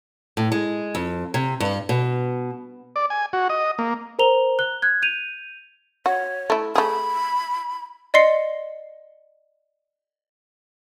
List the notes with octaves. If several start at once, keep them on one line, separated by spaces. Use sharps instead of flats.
A2
G#3
F2
C3
G2
B2
D5
G#5
F#4
D#5
A#3
A#4 C5 A#5 F7 G7
F#6 G7
F#6 G#6
G6 D#7 F7
F#4 C#5
A3 E4
A3 G#4 B5
D5 D#5 C6 C7 C#7